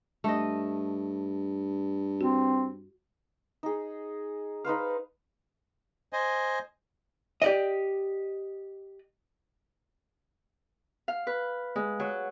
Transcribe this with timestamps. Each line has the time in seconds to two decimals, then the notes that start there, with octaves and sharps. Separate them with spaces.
0.24 G2 A3 D#5
2.21 C4 F#4
3.63 D#4 G#4
4.64 D#4 B4 C5 F5
6.13 C5 D#5 G#5
7.42 G4 D5 D#5
11.08 F5
11.27 B4
11.76 G#3
12.00 F#3